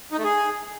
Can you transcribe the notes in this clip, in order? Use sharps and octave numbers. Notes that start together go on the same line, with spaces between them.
D#4
A3
G#4